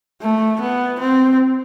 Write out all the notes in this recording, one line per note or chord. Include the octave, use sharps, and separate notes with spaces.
A3
B3
C4